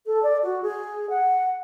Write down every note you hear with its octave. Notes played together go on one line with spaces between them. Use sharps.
A4
D5
F#4
G#4
F#5